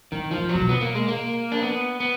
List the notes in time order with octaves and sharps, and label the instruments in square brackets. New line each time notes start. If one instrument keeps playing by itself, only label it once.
[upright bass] G#2 [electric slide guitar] D#3
[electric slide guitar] F3
[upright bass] G#2
[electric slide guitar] F#3
[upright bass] D3
B2
[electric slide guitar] B3
A#3
G#3
A#3
D4
B3
B3